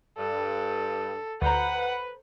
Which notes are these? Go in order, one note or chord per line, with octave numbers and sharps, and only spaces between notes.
G2 A4
D2 A4 B4 C5 F#5 A#5